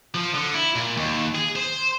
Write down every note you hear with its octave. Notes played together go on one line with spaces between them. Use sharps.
F3
D3
E4
A#2
D#2
G#4
C5